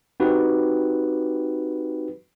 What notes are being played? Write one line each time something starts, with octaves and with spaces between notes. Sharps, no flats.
C4 D#4 F#4 G4 B4